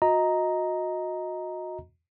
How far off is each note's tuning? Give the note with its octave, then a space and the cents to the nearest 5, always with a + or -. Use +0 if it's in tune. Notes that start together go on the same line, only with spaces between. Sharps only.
F#4 -30 D#5 +15 A#5 +0